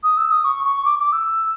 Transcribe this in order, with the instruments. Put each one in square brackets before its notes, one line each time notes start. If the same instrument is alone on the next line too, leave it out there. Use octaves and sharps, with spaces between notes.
[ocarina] D#6
E6
D#6
C#6
C#6
D6
D6
E6